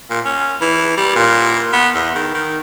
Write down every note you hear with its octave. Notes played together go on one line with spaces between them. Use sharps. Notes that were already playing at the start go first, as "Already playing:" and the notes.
A#2
C#4
E3
G3
A#2
B3
E2
D#3
D#3